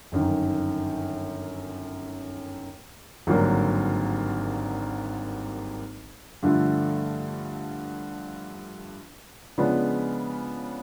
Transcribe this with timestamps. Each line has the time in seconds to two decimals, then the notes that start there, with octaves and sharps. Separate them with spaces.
0.12 G1 F#2 D#3
3.27 G#1 G2 D3 F#3 A#3
6.43 G2 D3 F3 A3
9.58 C#3 F3 G#3 B3 D4